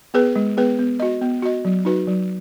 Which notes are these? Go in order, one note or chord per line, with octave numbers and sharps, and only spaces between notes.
B3 G#4 B4
G#3
B3 G#4 B4
B3
F#4 D#5
B3
F#4 D#5
F#3
D#4 F#4 B4
F#3